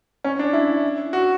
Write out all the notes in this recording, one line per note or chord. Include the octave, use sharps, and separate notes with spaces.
C#4
D4
E4
F#4